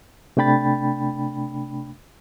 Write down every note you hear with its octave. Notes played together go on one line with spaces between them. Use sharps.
C3 A3 D4 G5 B5 A6